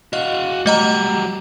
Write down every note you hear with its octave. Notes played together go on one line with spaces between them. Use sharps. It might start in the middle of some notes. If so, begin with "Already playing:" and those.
F#4 D#5 F5
F#3 G3 A3 D#5 A#5